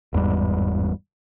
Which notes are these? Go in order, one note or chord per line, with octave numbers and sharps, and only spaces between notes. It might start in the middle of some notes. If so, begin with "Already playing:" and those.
G1 E2 G#2 G3